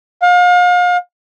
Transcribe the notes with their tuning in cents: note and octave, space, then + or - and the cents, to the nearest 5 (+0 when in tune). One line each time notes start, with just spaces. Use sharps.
F5 +35